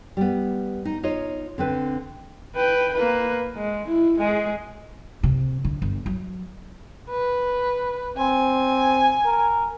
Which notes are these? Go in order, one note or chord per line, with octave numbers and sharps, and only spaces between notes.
G3 B3
D#4
D#4 F4 C#5 D#5
D3 C4 B4
B4 G5
A#3 B4
G#3
E4
G#3 G#4
C3
D3
G1
F#3
B4
C4 G#5
A#4